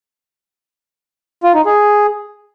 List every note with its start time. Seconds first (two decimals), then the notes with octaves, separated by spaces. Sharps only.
1.43 F4
1.54 D#4
1.66 G#4